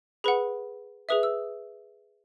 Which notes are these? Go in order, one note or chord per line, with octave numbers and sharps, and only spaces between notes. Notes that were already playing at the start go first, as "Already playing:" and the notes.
G#4 B4 F#5 B5
G#4 B4 E5 D#6
E6